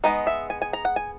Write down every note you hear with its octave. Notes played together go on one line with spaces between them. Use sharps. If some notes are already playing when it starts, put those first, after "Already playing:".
G#3 B3 D#4 D#5
E5
G#5
G#5
A#5
F#5
G#5